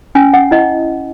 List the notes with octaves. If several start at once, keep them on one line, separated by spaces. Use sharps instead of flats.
C#4 G#5
C#4 F#5
E4 D#5